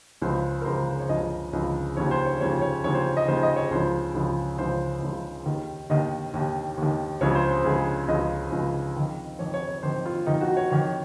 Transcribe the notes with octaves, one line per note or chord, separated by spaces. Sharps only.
C#2 C#3 F3 C5
A#4
C#2 C#3 F3 C5
C5
C#5
C#2 C#3 F3 D#5
C#2 C#3 F3
D#2 C#3 F3 C#5
C5
C#5
D#2 C#3 F3 C#5
C#5
D#2 C#3 F3 C#5
C5
D#5
D#2 C#3 F3 C5
D#5
C#5
C#2 C#3 F3 C5
C#2 C#3 F3
C#2 C#3 F3 C5
C#2 C#3 F3
D#2 D#3
D#2 D#3 D#5
D#2 D#3
D#2 D#3
C#2 C#3 F3 C#5
C5
C5
C#2 C#3 F3 G#4
C#2 C#3 F3 D#5
C#2 C#3 F3
F2 D#3
F2 D#3 C#5
C#5
C#5
F2 D#3 C5
F4
F2 D#3 D#4
F#4
C#5
F2 D#3 C#5